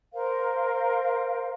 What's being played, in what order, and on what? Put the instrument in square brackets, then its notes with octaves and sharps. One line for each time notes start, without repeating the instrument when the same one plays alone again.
[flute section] A#4 C5 F5